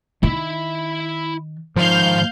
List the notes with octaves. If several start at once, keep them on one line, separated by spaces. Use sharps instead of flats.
D#3 E4 E5
G#2 D#3 F3 F5 G6